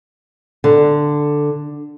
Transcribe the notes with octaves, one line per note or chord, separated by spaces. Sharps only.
D3